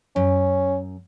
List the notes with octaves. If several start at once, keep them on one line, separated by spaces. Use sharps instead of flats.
F#2 C#4